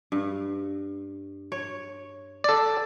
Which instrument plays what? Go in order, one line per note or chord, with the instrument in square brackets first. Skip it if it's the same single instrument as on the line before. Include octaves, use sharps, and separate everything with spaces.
[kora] G2
C#5
[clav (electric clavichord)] A4 D5